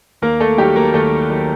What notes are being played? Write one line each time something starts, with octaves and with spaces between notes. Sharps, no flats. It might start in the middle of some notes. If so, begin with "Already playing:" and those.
D#2 A#3 A#4
A3 A4
D#3 F#3 G3 G4
A#3 A#4
D#2 A3 A4
D#3 F#3